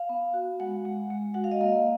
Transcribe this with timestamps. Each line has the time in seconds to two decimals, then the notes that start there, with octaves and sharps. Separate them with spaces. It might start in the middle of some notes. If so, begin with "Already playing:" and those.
Already playing: F5
0.09 B3
0.34 F#4
0.60 G#3 F#5
0.85 G#3
1.10 G#3
1.34 F#4 F#5
1.44 F5
1.52 D#5
1.61 A#3 F5